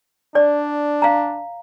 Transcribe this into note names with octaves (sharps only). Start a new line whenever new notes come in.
D4 D5
F5 A#5